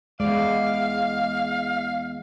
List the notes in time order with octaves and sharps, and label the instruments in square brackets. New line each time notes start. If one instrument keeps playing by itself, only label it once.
[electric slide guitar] E2 D5 [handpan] G#3 [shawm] F5